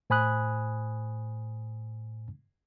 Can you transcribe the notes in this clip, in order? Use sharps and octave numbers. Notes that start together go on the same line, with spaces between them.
A2 C5 G#5 B5 D#6 F#6